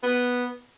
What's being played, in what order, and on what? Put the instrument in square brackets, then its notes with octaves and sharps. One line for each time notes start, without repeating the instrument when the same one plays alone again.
[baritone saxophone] B3